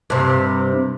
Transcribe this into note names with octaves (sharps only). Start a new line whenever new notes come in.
G2 C3